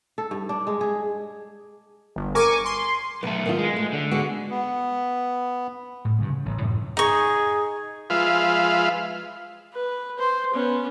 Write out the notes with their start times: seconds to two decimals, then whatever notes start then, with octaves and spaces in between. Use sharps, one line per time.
0.18 A4
0.31 G2
0.49 D4
0.67 G#3
0.81 G#4
2.16 G1
2.35 A#4 G#5 C#6 D6
2.65 C6
3.23 B1 A3 B4
3.46 D#3 B3 F4
3.59 G#3
3.76 A3
3.93 D3
4.11 G#3 B3 F#4
4.50 B3
6.05 A2
6.19 G2 C#3 G#3
6.30 C#3
6.46 A1
6.61 F#2 A2 C3
6.97 D#4 G#4 C#6
8.10 F3 G#3 F4 B4 E5 F5
9.73 B4
10.18 C5
10.54 B3 C#4